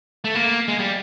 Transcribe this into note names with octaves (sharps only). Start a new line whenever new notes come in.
A3
A#3
G#3
G3